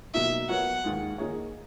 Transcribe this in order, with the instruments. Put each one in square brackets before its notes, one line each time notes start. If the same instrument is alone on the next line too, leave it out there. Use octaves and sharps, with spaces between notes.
[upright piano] B2 F#3 A#3 D#4 [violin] E5
[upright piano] F#3 B3 F#4 A#4 C#5 [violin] F#5
[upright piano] D#2 D#3 G#3
D#3 A#3 D#4 G#4 C#5